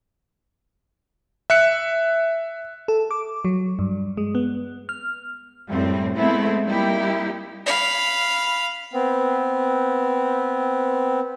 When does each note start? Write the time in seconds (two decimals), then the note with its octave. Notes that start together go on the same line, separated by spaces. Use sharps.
1.50 E5 F#6 C#7
2.88 A4
3.11 D6
3.45 F#3
3.79 G2
4.17 G#3
4.35 B3
4.89 F6
5.68 F#2 A2 G3 C4
6.17 G#3 A3 B3 C4 E4
6.63 G3 A#3 D#4 E4 G4
7.66 F5 B5
8.93 B3 C4